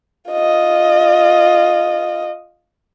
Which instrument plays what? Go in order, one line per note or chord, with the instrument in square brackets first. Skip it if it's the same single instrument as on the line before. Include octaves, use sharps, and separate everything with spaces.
[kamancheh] F4 D#5